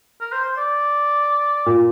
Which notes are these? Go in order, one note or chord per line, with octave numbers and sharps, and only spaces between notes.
A#4
C5
C5
D5
A#2